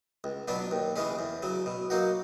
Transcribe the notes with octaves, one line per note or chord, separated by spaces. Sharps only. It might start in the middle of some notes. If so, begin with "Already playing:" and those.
C#2
B2 F#3 B3 D4
D#2
C#3 E3 G#3 C#4
E2
C#3 F#3
B2
F#3 A#3 D#4 F#4